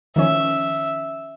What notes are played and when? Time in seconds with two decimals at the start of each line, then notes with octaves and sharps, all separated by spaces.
0.16 D#3 F3 C#4 E5